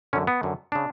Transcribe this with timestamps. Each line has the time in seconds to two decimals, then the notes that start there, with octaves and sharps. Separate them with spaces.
0.13 F#2 D3 C#4
0.27 B3
0.43 F#2 D3
0.72 C#3 D4